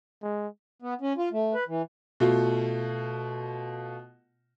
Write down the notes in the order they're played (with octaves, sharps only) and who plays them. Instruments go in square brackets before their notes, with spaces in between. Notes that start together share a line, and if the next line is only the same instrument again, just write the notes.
[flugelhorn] G#3
[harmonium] B3
C#4
F4
A3
B4
E3
[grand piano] B2 A3 F4